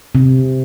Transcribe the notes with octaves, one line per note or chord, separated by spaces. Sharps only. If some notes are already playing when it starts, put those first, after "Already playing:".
C3